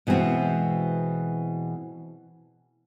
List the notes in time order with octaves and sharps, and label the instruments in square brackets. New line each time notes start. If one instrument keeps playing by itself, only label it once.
[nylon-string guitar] B2 E3 G#3 C4 F#4